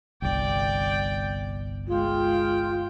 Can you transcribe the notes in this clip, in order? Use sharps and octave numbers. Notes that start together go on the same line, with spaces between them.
G1 C2 D5 G5
G#3 F4 G5